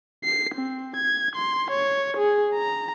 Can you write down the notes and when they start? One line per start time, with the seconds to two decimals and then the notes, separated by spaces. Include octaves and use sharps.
0.24 C7
0.54 C4
0.96 G#6
1.35 C6
1.71 C#5
2.17 G#4
2.55 A#5